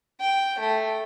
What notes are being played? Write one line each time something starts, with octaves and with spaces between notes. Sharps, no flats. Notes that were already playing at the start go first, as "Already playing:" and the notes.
G5
A3